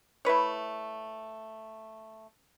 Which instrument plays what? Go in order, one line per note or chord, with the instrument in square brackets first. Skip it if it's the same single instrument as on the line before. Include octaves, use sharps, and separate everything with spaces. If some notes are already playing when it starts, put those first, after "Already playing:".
[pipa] A3 E4 B4 C#5